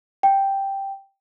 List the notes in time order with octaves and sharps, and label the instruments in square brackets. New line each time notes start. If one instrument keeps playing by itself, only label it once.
[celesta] G5